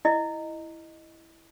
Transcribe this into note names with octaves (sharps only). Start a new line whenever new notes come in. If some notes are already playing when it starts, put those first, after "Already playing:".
E4 D#5